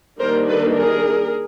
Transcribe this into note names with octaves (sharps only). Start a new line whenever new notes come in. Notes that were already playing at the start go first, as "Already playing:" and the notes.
D#3 G3 A#3 D4 A#4 C5
A4 B4
G#4 A#4